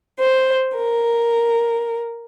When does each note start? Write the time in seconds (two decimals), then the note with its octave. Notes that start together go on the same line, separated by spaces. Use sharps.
0.19 C5
0.76 A#4